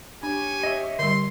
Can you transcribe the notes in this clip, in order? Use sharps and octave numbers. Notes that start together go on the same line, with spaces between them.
D4 G4 C#5 G#5
D#5 E5
D3 G3 C6